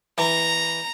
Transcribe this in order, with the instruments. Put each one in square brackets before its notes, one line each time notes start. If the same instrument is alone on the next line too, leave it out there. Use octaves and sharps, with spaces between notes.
[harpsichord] E3 [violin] A#5